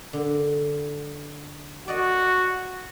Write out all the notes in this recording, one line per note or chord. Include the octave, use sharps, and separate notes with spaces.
D3
F#4 D5 D#5 F#5